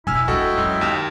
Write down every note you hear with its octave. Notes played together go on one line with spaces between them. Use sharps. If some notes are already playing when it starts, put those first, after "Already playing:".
E1 E4 G#5 E6 F6
G#3 D4 F#4 A4 D#5 G5
F#2 G#3
D#2 F6 E7